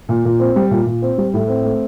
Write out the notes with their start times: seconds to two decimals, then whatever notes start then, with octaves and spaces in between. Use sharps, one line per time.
0.09 A#2
0.25 A#2
0.40 C4
0.56 G3
0.71 A#2
0.86 A#2
1.02 C4
1.18 G3
1.34 A2
1.48 C4
1.65 A3